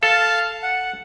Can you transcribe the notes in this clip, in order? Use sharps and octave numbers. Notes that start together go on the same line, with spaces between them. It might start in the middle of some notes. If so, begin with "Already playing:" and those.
A4 F5 A5
F#5